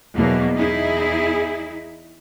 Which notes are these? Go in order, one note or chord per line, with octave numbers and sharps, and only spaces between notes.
E2 B2 F#3 A#3
E2 D#4 E4 G#4